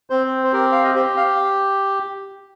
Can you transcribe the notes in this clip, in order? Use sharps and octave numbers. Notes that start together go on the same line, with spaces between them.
C4 C5
C5
G4 A#4
F5
D#5
G4 C5
F5